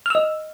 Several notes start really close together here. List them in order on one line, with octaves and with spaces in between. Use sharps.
F6 E6 D#5